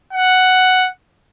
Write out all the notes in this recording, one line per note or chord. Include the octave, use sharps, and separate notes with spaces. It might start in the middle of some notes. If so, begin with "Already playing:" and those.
F#5